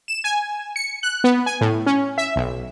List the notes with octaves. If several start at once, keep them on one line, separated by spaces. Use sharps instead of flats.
E7
G#5
C#7
F#6
B3
G#5
A2
C#4
E5
B1